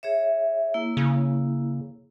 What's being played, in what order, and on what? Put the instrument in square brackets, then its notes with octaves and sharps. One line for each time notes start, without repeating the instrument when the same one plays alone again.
[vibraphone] G#4 C#5 E5
A#3 E4
[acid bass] C#3